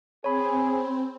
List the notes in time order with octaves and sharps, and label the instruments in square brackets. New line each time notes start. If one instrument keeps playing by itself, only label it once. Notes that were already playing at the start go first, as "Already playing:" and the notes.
[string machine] C4 [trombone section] G#4 [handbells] C#5 B5